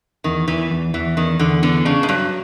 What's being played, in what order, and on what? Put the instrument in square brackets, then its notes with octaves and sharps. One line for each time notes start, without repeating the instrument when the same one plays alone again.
[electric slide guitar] E2 [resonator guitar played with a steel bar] D#3
[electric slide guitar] E2 [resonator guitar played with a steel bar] E3
[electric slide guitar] E2
[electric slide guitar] E2 [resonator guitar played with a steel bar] E3
[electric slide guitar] E2 [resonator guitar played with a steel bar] D#3
[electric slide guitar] E2 [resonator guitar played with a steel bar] D3
[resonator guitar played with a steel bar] D3 [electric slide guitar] B3
[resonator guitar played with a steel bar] C#3 [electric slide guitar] D4
[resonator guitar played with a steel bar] G#2
[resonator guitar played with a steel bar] G2 [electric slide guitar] F#3